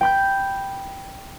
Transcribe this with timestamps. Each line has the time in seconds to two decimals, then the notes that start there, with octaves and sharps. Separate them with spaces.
0.01 G5 B5 G6